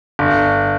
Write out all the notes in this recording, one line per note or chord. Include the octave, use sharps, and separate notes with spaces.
G1